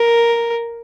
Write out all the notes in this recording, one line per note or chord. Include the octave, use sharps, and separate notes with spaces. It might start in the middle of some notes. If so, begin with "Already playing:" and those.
Already playing: A#4